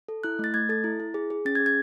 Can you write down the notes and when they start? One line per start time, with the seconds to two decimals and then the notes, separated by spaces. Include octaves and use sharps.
0.08 A4
0.24 E4 F#6
0.39 A3 A6
0.54 A3 G#6
0.69 A4 A6
0.84 E4
1.00 E4
1.14 G#4
1.30 G#4
1.45 C#4 A6
1.55 G#6
1.60 G#4
1.66 G#6